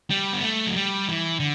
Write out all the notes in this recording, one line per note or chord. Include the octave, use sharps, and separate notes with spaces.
G3
B3
A3
F#3
G3
E3
D3